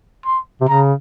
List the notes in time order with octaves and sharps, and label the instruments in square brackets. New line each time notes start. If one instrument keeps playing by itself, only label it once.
[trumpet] C6
[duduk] C3
[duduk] C#3 [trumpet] A#5